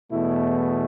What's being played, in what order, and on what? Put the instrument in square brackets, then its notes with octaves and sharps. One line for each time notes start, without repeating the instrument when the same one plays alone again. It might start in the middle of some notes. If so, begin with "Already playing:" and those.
[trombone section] E2 B2 A3 E4